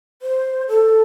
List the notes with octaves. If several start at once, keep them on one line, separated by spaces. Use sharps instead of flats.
C5
A4